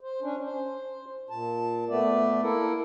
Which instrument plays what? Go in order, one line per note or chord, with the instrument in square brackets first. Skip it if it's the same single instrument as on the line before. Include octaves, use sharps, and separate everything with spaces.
[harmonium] C5
C#4 D4
C5
A#2 A5
A3 B3 D5
A#3 E4 A4 A#4